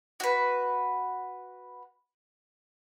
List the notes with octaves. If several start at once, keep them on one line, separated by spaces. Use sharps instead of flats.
F#4 B4